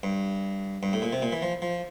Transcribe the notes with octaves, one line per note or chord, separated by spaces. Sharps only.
G2
G2
A2
A#2
C3
A#2
E3
F3
F3